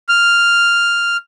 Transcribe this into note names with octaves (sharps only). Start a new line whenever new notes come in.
F6